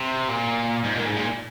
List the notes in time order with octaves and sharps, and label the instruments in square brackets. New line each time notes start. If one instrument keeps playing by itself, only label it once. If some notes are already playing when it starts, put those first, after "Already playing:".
Already playing: [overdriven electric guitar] C3
A#2
G#2
A#2
G#2
A#2